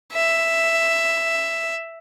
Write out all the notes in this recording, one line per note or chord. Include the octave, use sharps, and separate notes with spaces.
E5